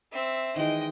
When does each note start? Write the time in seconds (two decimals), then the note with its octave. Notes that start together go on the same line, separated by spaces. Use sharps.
0.12 C4 E5
0.56 D#3 E3 G#3 D#5 G5